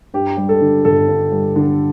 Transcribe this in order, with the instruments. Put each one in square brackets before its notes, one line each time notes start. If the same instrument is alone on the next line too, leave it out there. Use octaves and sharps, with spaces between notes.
[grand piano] G2 G4
G3
A4
D3
G1 A4
G2
G3
D3